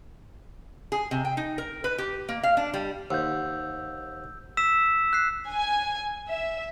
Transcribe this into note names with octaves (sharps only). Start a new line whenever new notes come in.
G#4
C3
G5
D#4
A#4
B4
G4
A#3
F5
D4
G3
D#2 C5 F5 F#5 E6 G6
E6 B6 E7
F#6 C7
G#5
E5